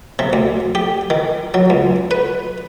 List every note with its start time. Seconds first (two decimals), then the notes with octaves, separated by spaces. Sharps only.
0.19 C3
0.33 D2
0.75 G4
1.10 D#3
1.54 F#3
1.70 C#2
2.11 B4